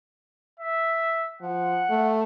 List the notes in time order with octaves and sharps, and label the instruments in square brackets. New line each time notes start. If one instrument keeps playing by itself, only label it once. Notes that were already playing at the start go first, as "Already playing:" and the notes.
[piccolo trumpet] E5
[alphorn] F3 [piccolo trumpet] F#5
[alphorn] A3